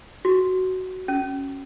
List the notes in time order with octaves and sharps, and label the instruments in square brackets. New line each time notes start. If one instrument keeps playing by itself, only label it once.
[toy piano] F#4
C#4